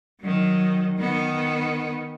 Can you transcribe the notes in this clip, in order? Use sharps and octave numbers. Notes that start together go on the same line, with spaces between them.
D#3 F#3
D#3 B3